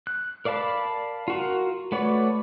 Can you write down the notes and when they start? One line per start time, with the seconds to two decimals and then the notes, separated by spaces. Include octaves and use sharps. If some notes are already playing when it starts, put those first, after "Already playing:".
0.07 F#6
0.45 A#4 D5 F5 A5 B5
1.28 F4 F#4 A#4
1.92 A3 F#4 B4 C#5 D5